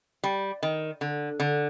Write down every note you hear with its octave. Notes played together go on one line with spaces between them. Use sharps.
G3
D#3
D3
D3